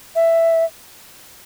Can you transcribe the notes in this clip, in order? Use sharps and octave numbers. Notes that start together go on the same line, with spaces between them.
E5